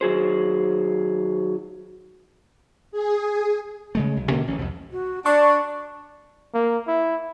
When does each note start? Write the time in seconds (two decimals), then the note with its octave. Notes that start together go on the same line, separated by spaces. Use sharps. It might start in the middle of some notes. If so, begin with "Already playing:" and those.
0.01 D#3 F#3 G#4 C5
2.92 G#4
3.95 C#3 G#3 A3
4.17 B1
4.29 B2 D3 A#3 C#4
4.47 A1 E3 C#4
4.59 C2 F2
4.92 F#4
5.26 D4 D5 C#6
6.55 A#3
6.88 E4